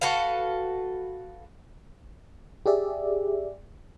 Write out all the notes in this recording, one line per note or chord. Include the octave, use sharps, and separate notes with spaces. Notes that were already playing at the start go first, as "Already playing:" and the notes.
F#4 A4 B4 F5
G4 G#4 D5 E5